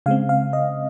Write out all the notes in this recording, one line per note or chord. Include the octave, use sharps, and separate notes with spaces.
C#3 G#3 C4 F5
F5
D#5